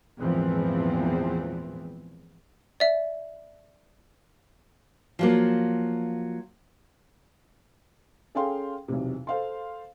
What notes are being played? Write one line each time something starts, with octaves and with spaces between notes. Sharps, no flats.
G#1 E2 A#2 E3 F3 C4
D5 E5
F3 F#3 A#3
C#4 G#4 A4 F5 G5 C6
B1 E2 C3
A4 C5 F5 C6